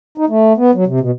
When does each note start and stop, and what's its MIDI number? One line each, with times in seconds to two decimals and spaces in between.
0.18 0.25 63
0.29 0.53 57
0.57 0.71 59
0.75 0.84 54
0.87 1.00 48
1.00 1.11 47